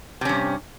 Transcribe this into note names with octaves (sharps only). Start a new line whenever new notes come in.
G2 C3 C#4